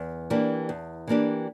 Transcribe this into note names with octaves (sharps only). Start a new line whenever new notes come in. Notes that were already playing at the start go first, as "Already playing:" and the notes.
Already playing: E2
E3 A#3 D4 G4
E2
E3 A#3 D4 G4